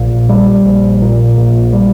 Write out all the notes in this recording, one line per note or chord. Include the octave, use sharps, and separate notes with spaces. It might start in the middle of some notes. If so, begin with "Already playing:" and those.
Already playing: A#1 A#2
G3
A#1
A#2
A#1
G3